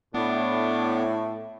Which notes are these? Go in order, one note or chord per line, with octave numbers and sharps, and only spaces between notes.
A2 B3 D4